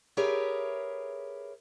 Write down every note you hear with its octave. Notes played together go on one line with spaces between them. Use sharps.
G4 G#4 A#4 B4 C#5 E5